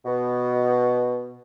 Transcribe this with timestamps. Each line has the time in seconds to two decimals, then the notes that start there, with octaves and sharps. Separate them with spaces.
0.05 B2